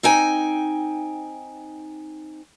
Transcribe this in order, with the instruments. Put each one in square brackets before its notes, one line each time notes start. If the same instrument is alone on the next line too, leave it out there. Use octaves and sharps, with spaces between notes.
[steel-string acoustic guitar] C4 D#4 G5 G#5